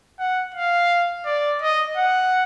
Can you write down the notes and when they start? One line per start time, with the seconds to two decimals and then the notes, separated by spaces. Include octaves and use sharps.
0.19 F#5
0.55 F5
1.26 D5
1.62 D#5
1.97 F#5